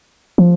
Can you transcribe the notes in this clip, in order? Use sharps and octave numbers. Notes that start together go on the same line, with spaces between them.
F3